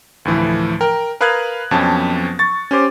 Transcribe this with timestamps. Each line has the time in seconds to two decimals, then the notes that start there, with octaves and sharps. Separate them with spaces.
0.25 D2 A2 E3 F3
0.81 A#4 G5
1.21 A#4 B4 F5 D#6 F#6 G#6
1.71 F2 B2 F3 F#3 C#4 A5
2.39 C#6 A6
2.71 C#4 G4 C5 D6